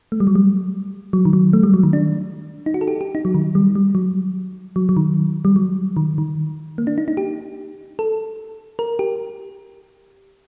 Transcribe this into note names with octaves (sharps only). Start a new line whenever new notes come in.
A3
G3
F#3
G3
F#3
D#3
F#3
A3
G3
F#3
D#3
D4
D#4
F#4
A4
G4
G4
D#4
F#3
D#3
G3
G3
F#3
F#3
F#3
D#3
G3
F#3
D#3
D#3
A#3
D4
D#4
D#4
G4
A4
A#4
G4